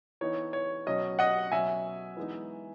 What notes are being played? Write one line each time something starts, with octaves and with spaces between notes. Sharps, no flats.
E3 B3 D#4 C#5
C#5
B2 F#3 C#4 D#5
D#5 F#5
B2 F#3 C#4 E5 G#5
E3 G#3 B3 D#4